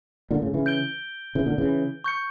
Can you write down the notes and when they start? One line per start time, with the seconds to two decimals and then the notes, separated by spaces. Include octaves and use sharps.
0.31 A#2 D3
0.42 A2 C#3
0.54 C#3 E3
0.66 G6 D7 G7
1.35 C#3 E3
1.46 A#2 D3
1.58 C#3 E3
2.04 C#6 G6 C#7